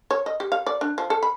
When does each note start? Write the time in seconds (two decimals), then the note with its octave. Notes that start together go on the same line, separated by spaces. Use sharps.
0.11 C#5
0.26 D#5
0.40 G4
0.52 F5
0.67 D5
0.81 D4
0.98 F3
1.10 A4
1.23 B5